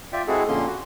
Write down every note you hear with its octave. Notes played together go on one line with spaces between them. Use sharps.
F4 D5 E5 G5
G#3 C4 E4 F#4 G#4 A4
F2 A#2 D3 A#3 C#4 C6
F#4